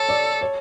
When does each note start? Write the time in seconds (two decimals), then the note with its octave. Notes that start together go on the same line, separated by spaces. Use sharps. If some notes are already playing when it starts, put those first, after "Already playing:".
Already playing: A4 C#5
0.09 D5
0.41 C#5